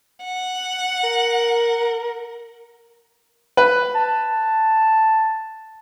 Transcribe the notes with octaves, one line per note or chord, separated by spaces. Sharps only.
F#5
A#4
B4
A5